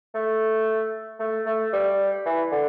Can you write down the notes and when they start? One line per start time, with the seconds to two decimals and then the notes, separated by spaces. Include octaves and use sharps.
0.15 A3
1.20 A3
1.46 A3
1.73 G3
2.25 E3
2.52 D3